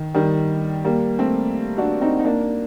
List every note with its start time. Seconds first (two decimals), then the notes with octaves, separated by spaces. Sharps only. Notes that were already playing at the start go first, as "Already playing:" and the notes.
Already playing: D#3
0.14 D#3 G3
0.85 G3 A#3
1.19 A3 C4
1.78 D4 F#4
2.01 C4 D#4
2.19 D#4
2.25 A#3 D4